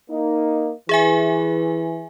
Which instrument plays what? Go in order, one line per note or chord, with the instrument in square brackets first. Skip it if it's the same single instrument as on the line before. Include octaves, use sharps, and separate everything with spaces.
[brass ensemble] A#3 D#4
[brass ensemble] E3 [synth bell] G#4 E5 G#5